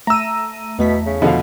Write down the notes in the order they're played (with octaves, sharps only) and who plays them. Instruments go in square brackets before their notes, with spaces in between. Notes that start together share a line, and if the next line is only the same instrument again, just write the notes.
[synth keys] A3 D#7 [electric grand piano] A#5 E6
[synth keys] E2 A3 B6 [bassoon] B2
[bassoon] C#3
[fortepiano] B2 D3 F5 [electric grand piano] F3